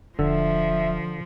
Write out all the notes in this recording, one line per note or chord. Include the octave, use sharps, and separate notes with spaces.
E1 D3 F3 E5